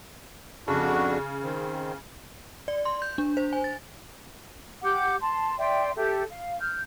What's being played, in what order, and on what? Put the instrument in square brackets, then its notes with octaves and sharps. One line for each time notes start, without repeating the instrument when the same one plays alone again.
[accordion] F2 D4 F#4 [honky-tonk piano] C#3
[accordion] D#3 C4
[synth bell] D5
C6
G6
D4
C5
G#5
A6
[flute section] G4 F#5 D6 G6
A5 C6
D5 E5 G5 C6
G4 A4 E5
F5
F6 G6